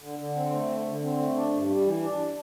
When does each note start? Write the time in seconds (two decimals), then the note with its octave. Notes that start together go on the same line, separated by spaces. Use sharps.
0.02 D3
0.19 D3
0.36 C4
0.53 A3
0.70 D3
0.86 D3
1.03 C4
1.19 A3
1.36 D4
1.53 G2
1.69 G3
1.86 E3
2.03 D4